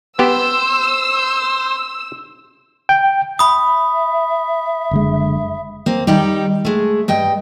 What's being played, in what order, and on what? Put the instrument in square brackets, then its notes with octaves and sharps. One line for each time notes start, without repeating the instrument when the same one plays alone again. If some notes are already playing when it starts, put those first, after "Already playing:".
[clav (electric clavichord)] B3 G4 [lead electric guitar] C5 [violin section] E6
[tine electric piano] G5
[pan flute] E5 [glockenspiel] B5 D#6
[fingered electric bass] F#1 D3 G#3
[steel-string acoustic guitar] A#3 C4
D#3 G3 D#4 G4
G#3 A3
G2 D#5 G5